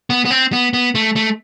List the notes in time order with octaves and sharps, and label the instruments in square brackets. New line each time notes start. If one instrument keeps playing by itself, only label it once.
[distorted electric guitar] B3
B3
C4
B3
B3
A3
A3